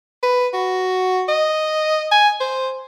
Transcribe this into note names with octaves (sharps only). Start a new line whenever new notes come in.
B4
F#4
D#5
G#5
C5